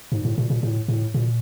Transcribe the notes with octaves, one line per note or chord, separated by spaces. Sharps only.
G#2
A2
A#2
A#2
A2
A2
A#2